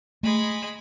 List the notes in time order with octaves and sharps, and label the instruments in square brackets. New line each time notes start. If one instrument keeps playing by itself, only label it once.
[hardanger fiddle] G#3 B5 [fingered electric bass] A3